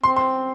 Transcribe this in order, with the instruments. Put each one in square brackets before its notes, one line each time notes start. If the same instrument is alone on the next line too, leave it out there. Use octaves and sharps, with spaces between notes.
[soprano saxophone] C4 [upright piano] C6
[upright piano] C6